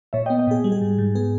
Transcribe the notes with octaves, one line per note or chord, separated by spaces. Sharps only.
A#2 C#5 E5
D#5 G5
B3
D#5 G5
A#2 G#4
G3
G#4
G#2
G#2
B3 G#4